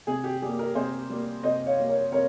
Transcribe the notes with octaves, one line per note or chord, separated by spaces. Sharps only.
C3 G#4
G4
G3 A#3 G#4
G4 A#4
C3 G#4 C5
G3 A#3
C3 C5 D#5
C#5 F5
G3 A#3
A#4 C#5
C3 A#4 C#5